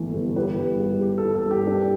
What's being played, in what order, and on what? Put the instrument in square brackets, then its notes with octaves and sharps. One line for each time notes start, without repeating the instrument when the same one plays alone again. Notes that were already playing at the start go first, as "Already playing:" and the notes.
Already playing: [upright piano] G1 E3 A3
G1
[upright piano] E4 [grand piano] G4 B4
[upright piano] G2
G3
G4
[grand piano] A4
[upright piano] E4
[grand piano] A4
[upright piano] G2 [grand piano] G4
[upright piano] D4